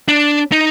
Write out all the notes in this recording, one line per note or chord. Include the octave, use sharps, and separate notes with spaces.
D4
D#4